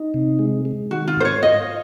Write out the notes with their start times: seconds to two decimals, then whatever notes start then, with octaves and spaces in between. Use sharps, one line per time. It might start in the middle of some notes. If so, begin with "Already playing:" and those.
Already playing: D#4
0.14 C3
0.39 G#3
0.65 G#3
0.91 D#3 F#4
1.08 F4
1.17 G#2 C5
1.25 C#5
1.42 F4 D#5